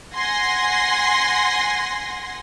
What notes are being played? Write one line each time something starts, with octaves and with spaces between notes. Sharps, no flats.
F#5 G#5 C6 A#6 C7